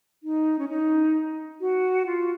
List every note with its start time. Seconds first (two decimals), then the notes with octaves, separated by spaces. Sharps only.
0.23 D#4
0.59 C#4
0.68 D#4
1.61 F#4
2.06 F4